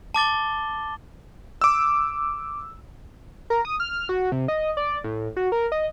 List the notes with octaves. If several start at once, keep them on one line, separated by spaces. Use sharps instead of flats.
A5 D6 A6 G7
D6 E6
A#4
D#6
F6
F#4
C3
D#5
D5
A2
F#4
A#4
D#5